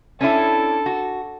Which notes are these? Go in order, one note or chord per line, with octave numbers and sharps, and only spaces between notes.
C#4 D4 E4 A4
F#4